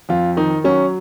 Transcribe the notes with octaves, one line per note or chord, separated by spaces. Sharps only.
F2 F4
D#3 D#4
F#3 C#4